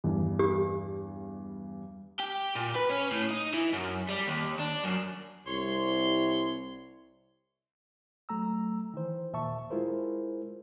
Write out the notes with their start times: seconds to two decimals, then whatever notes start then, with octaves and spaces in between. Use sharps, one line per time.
0.04 E2 G2
0.39 G4
2.19 G4
2.56 A#2
2.76 B4
2.90 C#4
3.12 A2
3.31 D#4
3.54 E3
3.73 F#2
4.09 G3
4.27 D#2
4.60 D4
4.84 F#2
5.47 C2 C#5 C6
8.29 F#3 A3 A#5 E6
8.94 D#3 E3 C5
9.33 D#2 A#2 E5 A5 C#6
9.70 G#3 E4 F4 G#4 A#4 C5